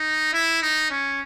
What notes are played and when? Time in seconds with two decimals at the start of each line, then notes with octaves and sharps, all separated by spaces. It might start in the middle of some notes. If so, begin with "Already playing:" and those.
Already playing: D#4
0.33 E4
0.62 D#4
0.91 C#4